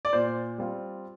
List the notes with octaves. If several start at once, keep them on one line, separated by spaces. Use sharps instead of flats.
D5
A#2 C5
G3 C4 F4